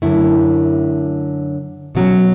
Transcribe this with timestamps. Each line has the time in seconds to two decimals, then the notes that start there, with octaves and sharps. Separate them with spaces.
0.02 F#2 D3 A3 E4
1.95 B2 F#3 C#4